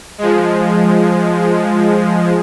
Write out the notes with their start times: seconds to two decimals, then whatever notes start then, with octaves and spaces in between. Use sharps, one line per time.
0.18 F3 G#3